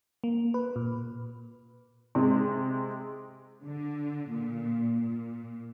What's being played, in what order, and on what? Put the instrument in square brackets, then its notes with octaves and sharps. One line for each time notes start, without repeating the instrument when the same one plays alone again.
[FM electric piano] A#3
B4
A#2
[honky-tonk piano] C3 G#3
[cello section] D3
A#2
A#2